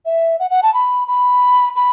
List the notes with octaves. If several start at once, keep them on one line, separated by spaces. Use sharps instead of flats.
E5
F#5
F#5
A5
B5
B5
B5